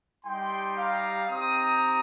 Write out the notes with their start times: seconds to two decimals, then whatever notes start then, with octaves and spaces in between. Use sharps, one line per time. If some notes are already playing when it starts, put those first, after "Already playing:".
0.25 G3 D#4 G4 G5 C6
0.77 F5 A#5
1.29 C4 D#4 G4 A#5 D#6